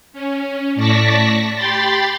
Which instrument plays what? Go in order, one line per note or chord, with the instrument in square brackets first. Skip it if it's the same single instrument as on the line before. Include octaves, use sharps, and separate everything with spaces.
[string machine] C#4
A2 D5 A5 C#6 A#6 B6
G4 G5 B5 C6 A6